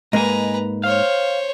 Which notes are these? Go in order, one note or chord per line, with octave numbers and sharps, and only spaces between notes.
G#2 A#3 B4 D#5 G#5 A#5
C5 C#5 F5